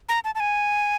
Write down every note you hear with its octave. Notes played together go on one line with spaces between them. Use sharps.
A#5
A5
A5
G#5